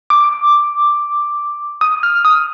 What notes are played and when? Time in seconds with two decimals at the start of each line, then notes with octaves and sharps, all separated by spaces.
0.10 D6
1.81 D#6
2.03 F6
2.25 D#6